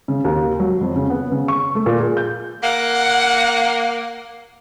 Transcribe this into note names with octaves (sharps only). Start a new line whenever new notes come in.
C#3
D#2
F#3
F2
C#3
B3
C#3
C#6
A3
A#2
G#4
G6
A#3 F#5